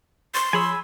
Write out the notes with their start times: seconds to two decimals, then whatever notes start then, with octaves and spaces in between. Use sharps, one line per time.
0.34 C6 C#6 A6
0.53 F3 G#4 C#5 G#5 B5 E6